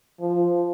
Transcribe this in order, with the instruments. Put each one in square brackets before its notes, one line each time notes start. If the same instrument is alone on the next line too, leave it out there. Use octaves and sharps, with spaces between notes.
[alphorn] F3